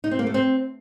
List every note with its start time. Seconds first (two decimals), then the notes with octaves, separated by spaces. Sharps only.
0.04 D#4
0.11 C4
0.19 A#3
0.27 A3
0.34 C4